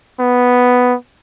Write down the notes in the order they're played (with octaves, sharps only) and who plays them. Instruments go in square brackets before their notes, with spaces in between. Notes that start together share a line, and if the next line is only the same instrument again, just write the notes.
[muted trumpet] B3